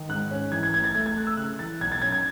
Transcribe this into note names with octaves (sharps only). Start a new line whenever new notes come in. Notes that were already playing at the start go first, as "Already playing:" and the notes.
Already playing: D#3
G#2 F#6
C#4
E3 G#6
G#6
A1 G#6
A6
A3 G#6
G#6
A3 F#6
E6
C#3 F#6
E3 A6
B1 G#6
A6
C#4 G#6
G#6